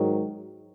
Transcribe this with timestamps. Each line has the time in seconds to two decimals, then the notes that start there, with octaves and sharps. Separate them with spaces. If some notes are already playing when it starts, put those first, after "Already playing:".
Already playing: G#2 D#3 F#3